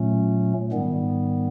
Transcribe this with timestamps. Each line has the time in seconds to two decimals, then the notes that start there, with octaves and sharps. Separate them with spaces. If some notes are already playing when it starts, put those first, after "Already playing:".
Already playing: A#2 F#3 A3 C#4
0.72 G#2 D#3 G3 B3